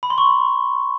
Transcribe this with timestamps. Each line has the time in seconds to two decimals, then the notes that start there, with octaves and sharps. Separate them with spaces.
0.03 B5
0.10 C6
0.18 C#6